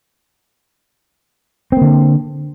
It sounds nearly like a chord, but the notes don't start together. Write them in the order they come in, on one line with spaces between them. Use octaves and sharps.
C4 A#3 D3